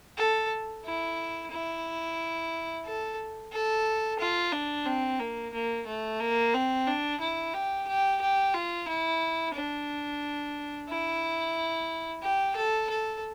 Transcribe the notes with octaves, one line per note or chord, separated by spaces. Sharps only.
A4
E4
E4
A4
A4
F4
D4
C4
A#3
A#3
A3
A#3
C4
D4
E4
G4
G4
G4
F4
E4
D4
E4
G4
A4
A4